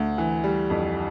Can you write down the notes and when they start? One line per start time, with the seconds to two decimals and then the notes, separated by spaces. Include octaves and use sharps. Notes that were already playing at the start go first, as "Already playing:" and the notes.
Already playing: D2
0.18 E3
0.44 G3
0.70 F2